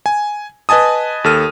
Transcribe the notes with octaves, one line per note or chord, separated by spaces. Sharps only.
G#5
B4 D#5 G#5 A5 D#6
D#2 A4 F6 D#7